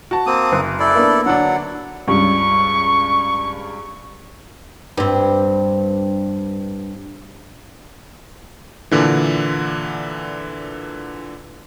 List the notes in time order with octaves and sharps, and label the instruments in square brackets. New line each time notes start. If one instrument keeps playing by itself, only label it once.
[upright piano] F#4 A5
[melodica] A#3 C4 D#6
[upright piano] F#1
[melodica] E4 A4 D5
[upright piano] A#3 B3 D4
[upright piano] D3 D4 [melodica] F#3 F#5
[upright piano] C#2 G2 [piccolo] C#6
[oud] G2 C4
[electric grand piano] A#2 D3 E3